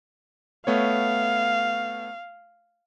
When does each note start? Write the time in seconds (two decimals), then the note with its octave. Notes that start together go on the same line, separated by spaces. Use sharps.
0.67 A3 B3 C#5 F5